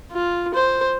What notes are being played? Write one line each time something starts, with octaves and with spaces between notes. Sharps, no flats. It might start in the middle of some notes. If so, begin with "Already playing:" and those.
F4
C5